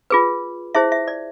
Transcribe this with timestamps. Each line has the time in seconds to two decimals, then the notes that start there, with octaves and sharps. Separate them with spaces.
0.10 F4 G#4 B4
0.75 E4 G#4 C5 E5
0.92 E5
1.08 D5